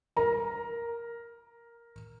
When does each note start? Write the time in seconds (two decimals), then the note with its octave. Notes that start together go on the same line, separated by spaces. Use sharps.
0.17 A#4 A#5